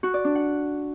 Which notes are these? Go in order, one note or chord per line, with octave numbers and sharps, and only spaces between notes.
F#4
D5
D4
F#5